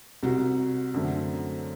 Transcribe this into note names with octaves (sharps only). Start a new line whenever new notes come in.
C2 C3 G3 F#4
F#2 D3 F#3 A3 C4